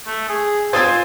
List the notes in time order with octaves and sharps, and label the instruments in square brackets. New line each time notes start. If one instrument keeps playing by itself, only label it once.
[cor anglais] A3
G#4
[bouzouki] C4 F4 C5 [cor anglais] G#5 [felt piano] C6 D#6 A6